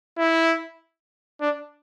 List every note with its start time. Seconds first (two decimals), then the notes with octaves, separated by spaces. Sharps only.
0.17 E4
1.40 D4